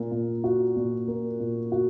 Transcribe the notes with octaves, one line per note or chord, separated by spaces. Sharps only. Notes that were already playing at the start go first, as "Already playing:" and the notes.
Already playing: A#2 A#3
A#2
F#4
A#2
A#3
A#2
F#4